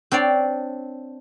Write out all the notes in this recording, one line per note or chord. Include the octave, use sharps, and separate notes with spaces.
C4 D4 C#5 D5